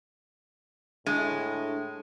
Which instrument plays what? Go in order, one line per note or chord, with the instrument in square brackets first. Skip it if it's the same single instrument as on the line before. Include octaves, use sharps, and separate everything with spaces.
[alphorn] A2 [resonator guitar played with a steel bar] G#3 [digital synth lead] D4